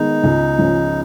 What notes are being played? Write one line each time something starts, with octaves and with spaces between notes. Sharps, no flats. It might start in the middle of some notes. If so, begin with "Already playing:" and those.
Already playing: D#3 G#3 B3 D#4
C#2
C#3 F3